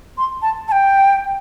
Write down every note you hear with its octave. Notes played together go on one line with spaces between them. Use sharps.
C6
A5
A5
G5